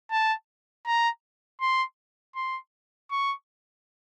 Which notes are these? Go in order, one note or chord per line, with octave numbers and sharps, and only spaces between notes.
A5
A#5
C6
C6
C#6